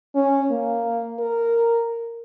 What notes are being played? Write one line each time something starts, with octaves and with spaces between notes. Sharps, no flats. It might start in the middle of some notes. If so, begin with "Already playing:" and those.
C#4
A#3
A#4